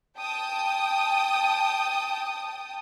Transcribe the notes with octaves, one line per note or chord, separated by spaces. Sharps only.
G5 A5 D#6